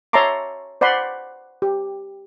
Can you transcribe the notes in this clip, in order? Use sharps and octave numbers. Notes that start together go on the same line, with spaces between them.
C#5 E5 A5 A#5 C6 D6
C5 D5 F#5 B5 C6
G4